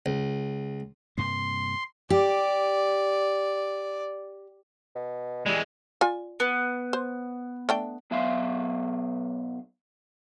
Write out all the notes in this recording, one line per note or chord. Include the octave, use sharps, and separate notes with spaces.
C#2
G2 C3 A#3 C6
G4 D5
B2
E3 G3 G#3
F4 D5 G#5
B3
C5
A3 D4 G5
B1 F#3 B3 E5 F5 C6